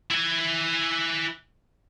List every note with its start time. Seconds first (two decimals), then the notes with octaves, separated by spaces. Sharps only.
0.11 E4 G#5